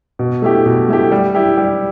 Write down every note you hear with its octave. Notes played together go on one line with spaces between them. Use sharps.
B2
A3 E4 G4
B2
A3 E4 G4
G3
E4 G4
G3